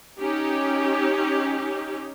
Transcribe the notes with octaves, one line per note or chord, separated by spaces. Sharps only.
C#4 D#4 G4